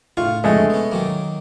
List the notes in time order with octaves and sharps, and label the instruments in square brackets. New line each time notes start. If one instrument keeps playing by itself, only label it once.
[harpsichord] A2 F5 C#6 [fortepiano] F4
[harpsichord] F2 D3 C#4 [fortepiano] G#3 A3
[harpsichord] B3 C#4
D#3 F#3 A#3